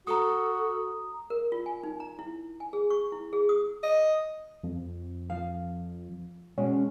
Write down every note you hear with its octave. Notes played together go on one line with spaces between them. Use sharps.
F#4 A4 A#5 D#6
A#4
F4
G#5
D#4
A#5
E4
G#5
G#4
C#6
E4
G#4
D#6
D#5
F2
F3 F5
B2 G#3 C#4